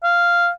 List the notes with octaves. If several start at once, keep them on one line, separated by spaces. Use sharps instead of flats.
F5